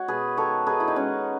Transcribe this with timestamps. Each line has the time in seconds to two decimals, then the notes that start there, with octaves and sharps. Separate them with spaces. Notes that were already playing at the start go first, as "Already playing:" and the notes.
Already playing: G#3 F#4 C#5
0.08 B2 G#4 B4
0.37 D#3 A4 C#5
0.66 D#3 G#4 B4
0.80 E4
0.88 D#4
0.96 G#3 C#4